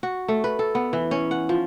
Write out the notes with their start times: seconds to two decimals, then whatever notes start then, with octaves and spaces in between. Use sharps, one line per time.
0.03 F#4
0.28 A3
0.44 B4
0.59 A4
0.75 B3
0.93 E3
1.11 C#4
1.31 F#5
1.49 F3